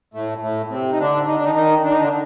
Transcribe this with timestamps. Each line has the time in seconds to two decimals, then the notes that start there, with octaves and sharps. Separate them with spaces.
0.14 A2 A3
0.42 A2 A3
0.70 C3 C4
0.92 D#4
0.99 D3 D4
1.27 D#4
1.36 D4
1.44 D#3 D#4
1.55 D#3 D#4
1.84 D4
1.92 D#4
2.01 D3 D4